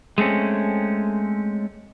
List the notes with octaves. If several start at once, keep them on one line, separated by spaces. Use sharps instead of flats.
G#3 A3 C4 C#4